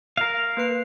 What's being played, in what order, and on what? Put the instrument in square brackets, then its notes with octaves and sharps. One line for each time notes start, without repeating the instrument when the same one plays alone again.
[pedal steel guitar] A#4 F5
[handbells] A#3 B4 C7